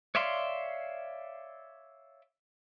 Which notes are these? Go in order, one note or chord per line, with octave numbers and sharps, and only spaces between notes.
C#5 D5 E5 F5 C6